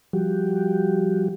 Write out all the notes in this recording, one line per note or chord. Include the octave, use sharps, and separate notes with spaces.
F3 G3 F#4 G4